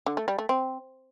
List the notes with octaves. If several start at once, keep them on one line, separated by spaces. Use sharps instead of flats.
D3
A3
G3
A3
C4